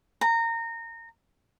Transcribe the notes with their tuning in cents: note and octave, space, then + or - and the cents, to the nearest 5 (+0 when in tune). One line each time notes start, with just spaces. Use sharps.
A#5 -20